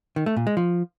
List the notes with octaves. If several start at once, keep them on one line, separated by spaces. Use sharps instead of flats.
D#3
A3
A#2
G#3
F3